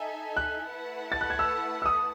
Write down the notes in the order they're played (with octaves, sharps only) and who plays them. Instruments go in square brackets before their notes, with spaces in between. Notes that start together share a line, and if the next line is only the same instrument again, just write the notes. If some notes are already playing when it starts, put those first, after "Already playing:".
Already playing: [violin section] D#4 A4 E5 G#5
[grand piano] F#6
[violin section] A3 E4 B4 F#5 A5
[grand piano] A6
F#6
G#6
E6
E6
D#6